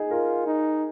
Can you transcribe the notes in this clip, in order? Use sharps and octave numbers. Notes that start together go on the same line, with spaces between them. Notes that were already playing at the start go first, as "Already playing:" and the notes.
Already playing: D#4 G#4
F4 A#4
D#4